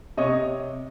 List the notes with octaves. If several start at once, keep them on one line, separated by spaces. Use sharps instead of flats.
C3 C#5 D#5